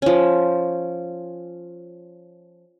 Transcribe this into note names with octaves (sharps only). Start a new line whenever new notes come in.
F3 C#4